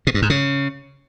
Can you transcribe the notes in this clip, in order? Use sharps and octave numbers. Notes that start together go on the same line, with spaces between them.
B2
G2
G#2
C#3